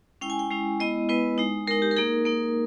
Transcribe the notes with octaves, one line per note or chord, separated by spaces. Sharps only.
G#3 C#4 E4 G5
G#5
G5
G#3 C#4 E4
G#3 B3 E4 D#5
G#3 B3 E4 B4
G#3 D#4
G#3 D#4 A#4
G4
A#4
A#3 D#4 G#4
A#3 D#4